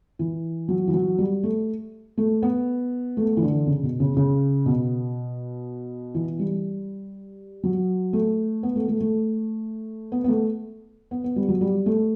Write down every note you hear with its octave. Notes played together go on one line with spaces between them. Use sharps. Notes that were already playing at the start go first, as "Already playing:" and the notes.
E3
F#3
E3
F#3
G3
A3
A3
B3
A3
E3
D3
C#3
B2
C#3
C#3
B2
E3
G3
F#3
A3
B3
A3
A3
A3
B3
B3
A3
B3
B3
G3
F#3
G3
A3